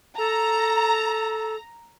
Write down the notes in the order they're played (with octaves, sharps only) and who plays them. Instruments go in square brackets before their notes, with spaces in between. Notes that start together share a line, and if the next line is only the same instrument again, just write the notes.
[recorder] A4 [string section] A#5